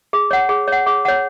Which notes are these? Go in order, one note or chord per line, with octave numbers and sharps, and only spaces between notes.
G#4
C#5 F#5
G#4
C#5 F#5
G#4
C#5 F#5